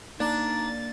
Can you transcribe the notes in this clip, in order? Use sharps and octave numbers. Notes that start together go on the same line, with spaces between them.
A#3 D4 D#4 A6